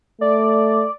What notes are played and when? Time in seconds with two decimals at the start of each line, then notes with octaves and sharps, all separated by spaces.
0.21 A3 D5